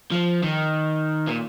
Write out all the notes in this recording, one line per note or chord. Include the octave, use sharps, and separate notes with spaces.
F3
D#3
A#2